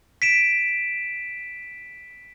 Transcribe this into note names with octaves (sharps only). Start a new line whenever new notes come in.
B6 D7 E7